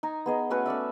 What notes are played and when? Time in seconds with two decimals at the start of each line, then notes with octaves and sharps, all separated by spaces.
0.03 D#4 G#5 A#5
0.26 B3 G#4 D#5
0.50 A3 C#4 F#4 B4
0.66 C#4 A4 D5 E5